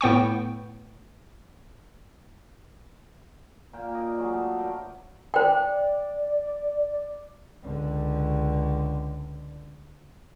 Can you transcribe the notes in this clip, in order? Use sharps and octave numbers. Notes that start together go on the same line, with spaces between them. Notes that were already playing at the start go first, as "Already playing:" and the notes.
A2 B3 G5 C#6
A#2 A#3 G5
A#4 D5 D#5
F#3 G#3 F5
A3
D4 A#4 B4 G5
C5 D5 G5
C#2 D3